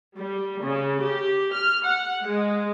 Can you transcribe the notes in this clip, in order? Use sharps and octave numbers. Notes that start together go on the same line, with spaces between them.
G3
C#3
G4
F6
F#5
G#3